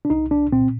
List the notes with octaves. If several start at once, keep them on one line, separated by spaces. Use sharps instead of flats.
D4
C2 D#4
D4
A#2 C4